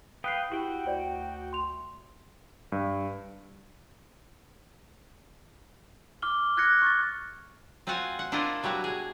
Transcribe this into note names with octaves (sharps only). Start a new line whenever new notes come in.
B4 F5 G5 D#6 F#6 C7
E4 F#4 G4 G5
D2 C5 D5
C6 F7
G2
D6 F6 G7
F6 F#6 G#6 A#6 C#7
C#6 G#6 A6
C4 F4 F#4 F5 F#5 G#5
F#5
D4 E4 F4 A#4 C5 D#5
B2 F#3 G3 E4 F#4
G#4